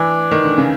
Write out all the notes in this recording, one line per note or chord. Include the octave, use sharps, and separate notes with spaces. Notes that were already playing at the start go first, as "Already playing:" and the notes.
Already playing: E3 D4
D#3
D3
C#3